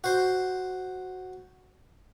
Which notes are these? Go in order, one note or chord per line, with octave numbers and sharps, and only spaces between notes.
F#4 C5